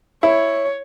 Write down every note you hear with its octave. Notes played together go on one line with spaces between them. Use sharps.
E4 C#5